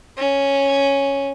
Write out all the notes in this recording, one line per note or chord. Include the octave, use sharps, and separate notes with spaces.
C#4